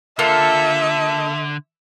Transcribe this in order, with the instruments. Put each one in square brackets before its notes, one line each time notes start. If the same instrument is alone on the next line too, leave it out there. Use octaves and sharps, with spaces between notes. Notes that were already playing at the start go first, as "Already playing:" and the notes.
[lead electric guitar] D3 [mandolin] A#3 F4 A4 [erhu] E5